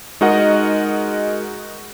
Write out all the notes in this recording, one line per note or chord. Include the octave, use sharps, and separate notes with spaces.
G#3 D#4 F#4 A#4 D#5 F#5